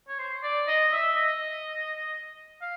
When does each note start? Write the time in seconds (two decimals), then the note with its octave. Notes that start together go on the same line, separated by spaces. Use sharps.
0.08 C#5
0.19 C5
0.43 D5
0.68 D#5
0.92 E5
1.16 D#5
2.61 F5